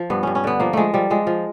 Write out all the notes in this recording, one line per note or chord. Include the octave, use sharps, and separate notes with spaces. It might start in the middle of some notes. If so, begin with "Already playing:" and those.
Already playing: F3
G2 B3
G2 C#4
C#4
D3 B3
F3 A#3
F3 G#3 A3
F3 G3
F3 G#3
F3